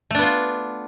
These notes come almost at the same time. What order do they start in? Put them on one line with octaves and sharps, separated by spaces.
A3 D4 B3 F4